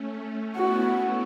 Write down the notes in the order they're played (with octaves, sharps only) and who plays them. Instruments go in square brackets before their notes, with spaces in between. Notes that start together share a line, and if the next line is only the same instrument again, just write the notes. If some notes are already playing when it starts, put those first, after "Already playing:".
Already playing: [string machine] A3 C#4
[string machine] B3 E4 [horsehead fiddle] F#4